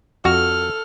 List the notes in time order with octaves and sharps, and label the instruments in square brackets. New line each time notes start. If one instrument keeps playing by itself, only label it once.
[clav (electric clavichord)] F2 F#4 [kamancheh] A4 F6